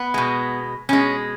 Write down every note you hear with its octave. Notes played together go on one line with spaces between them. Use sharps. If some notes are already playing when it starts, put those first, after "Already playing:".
Already playing: B3
B2 G#3
B2 G#3 C#4